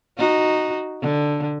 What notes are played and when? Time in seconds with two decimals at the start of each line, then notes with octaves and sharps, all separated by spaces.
0.18 D#4 F#4
1.02 D3